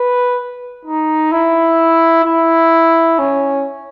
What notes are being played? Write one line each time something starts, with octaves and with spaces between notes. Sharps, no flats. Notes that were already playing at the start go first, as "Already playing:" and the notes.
Already playing: B4
D#4
E4
E4
C#4